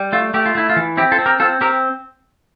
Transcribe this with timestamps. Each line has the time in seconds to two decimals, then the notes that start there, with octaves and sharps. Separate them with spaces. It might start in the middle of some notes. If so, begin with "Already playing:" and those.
Already playing: G3
0.13 A3 F4
0.34 A3 G4
0.46 F4
0.55 A3 E4
0.69 F4
0.76 E3
0.97 C4 E4 G4
1.12 F4 A4
1.19 C4
1.26 G4 A#4
1.40 C4 F4 A4
1.61 C4 G4 A#4